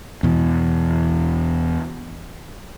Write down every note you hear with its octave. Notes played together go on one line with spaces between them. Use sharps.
E2 B2 E3